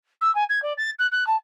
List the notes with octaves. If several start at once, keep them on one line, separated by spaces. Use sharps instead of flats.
E6
G#5
G#6
D5
A6
F#6
F#6
A5